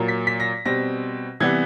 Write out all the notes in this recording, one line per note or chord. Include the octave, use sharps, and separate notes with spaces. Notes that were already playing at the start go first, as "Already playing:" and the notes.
Already playing: A#2 F#3 A#3
B6
B6
A#6
B2 G3 C4 A#6
C3 E3 G3 B3 G#6